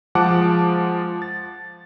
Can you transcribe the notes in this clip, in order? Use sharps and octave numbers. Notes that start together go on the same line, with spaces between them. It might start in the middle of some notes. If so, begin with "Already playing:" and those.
F3 G#3 F#5 A5 D6
A6